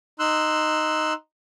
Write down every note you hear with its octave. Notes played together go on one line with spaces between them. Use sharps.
D#4 C6 E6 F#6